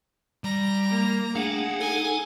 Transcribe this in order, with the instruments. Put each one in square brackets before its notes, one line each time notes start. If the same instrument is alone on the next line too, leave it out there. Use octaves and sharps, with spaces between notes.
[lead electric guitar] G3 [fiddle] A#5
[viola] A#3
[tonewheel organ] A3 D4 [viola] G#4 [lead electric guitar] F5 F#5
[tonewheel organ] D#4 A4 [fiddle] G#5